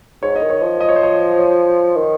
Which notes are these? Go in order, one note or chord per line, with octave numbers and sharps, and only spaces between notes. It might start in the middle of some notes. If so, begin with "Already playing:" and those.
G#2 C#5
D#5
D#3
C#5
F3
D#5
C#5
C5
C#5
C#5
D#3